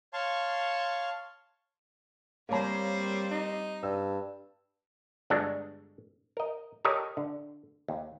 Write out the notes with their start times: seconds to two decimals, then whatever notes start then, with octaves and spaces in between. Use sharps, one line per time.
0.13 C#5 F5 A5 C6 C#6
2.49 G3 A#3 C4 C5 C#5 A#5
3.31 D#4
3.83 G2 E6
5.30 G1 G#3 D4 F#4 A4
6.37 A#4 D#5
6.85 G4 A4 A#4 C#5 D#5
7.17 D3
7.88 D#2